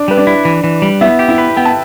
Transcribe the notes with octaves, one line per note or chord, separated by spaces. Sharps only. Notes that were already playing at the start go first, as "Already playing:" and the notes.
Already playing: D4 D5
G3 B4
D4 D5
E4
E3
E3
G3
B3 E4 E5
G4
E4 E5
B4
B3 G5
A5